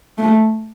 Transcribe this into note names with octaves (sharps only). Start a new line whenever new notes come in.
A3